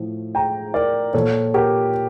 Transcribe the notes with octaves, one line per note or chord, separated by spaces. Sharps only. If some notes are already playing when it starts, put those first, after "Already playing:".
Already playing: A2 F3
G5 A#5
A#4 D5
A#2 F3 A4 C#5
G4 A#4